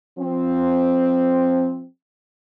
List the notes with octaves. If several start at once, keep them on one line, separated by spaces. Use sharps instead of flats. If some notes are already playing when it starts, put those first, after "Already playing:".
F3 C4